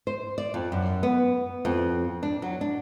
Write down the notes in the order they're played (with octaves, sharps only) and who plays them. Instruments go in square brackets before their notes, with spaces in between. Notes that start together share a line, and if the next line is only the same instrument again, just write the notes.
[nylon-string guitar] C5
D5
F2
F#2
B3
F2
D4
F#3
D4